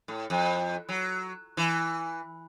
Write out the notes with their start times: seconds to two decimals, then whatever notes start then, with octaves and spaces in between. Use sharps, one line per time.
0.08 A2
0.30 F2
0.89 F#3
1.57 E3